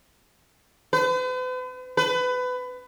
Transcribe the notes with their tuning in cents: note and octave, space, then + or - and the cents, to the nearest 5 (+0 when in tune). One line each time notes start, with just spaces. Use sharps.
B4 +45
B4 +25